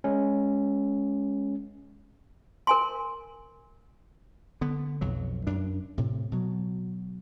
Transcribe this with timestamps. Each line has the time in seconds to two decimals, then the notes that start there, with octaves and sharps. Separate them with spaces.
0.04 G#3 C#4
2.67 A#4 G#5 C6
4.61 D3 B3
5.01 B1 F2 F#3
5.47 F#2 D4
5.98 A2 C3
6.32 B2 F#3